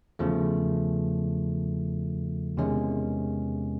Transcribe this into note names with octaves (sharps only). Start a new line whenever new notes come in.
E2 C#3 F3 A3
E2 C3 D#3 G#3 C#4